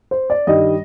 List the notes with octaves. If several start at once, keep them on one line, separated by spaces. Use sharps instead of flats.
C5
D5
G2 D#3 G3 D#5